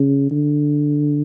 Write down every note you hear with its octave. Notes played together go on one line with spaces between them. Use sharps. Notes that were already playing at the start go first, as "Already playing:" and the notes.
Already playing: C#3
D3